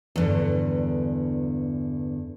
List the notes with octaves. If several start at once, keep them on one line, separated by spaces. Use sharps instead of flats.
E2 G2 D3